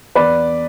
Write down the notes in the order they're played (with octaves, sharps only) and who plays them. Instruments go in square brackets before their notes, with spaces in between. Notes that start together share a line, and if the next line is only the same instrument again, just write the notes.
[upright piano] E2 B4 D5